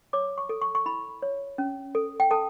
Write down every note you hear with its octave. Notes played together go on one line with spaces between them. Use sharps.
C#5 D6
C#6
A4
C#6
C#6
E4 B5
C#5
C#4
A4
G5
A4 A5